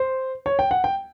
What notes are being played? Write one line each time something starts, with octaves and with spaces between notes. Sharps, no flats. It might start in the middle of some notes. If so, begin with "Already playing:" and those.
Already playing: C5
C#5
G5
F#5
G5